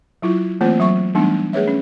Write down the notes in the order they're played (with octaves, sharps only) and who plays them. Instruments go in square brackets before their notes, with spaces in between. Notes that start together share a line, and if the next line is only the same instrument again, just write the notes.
[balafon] F#3 E4 F4
E3 A3 A#3 C4 F4 C5
F#3 E5 C#6
E3 G3 A3 B3 D4 D#4
A3 G#4 B4 C#5 E5
C#4